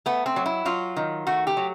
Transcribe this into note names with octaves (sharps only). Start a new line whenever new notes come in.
A3 B3
C4
F#3
E4
F#3 F4
D#3
A3 F#4
G4
F#3